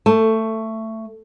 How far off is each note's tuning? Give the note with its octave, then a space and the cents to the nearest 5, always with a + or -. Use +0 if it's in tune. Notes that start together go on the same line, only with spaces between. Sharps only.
A3 +15 A5 +0